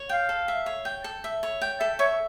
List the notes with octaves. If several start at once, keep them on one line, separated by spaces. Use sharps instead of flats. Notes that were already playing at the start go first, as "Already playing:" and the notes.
Already playing: C#5
F5 G5
A4
E5
C#5
G5
A4
E5
C#5
G5
A4 E5
C#5 E5